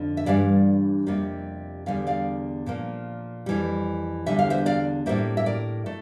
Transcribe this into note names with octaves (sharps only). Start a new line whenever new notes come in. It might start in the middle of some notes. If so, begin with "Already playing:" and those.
Already playing: F2 D3
E5
G2 E3 G3 D5 F5
F2 C3 G3 A#3
E2 D3 G3 F5
D5 F5
A#2 F3 A#3
F2 E3 G3
E2 D3 G3 E5
F5
C5 E5
D5 F5
A2 G3 A#3 C5 E5
E5
A#4 D5
A3